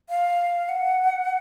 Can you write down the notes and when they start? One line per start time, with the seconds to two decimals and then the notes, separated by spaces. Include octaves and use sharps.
0.09 F5
0.69 F#5